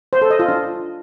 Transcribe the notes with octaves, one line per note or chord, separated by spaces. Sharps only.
C5
A4
D#5
F4
D4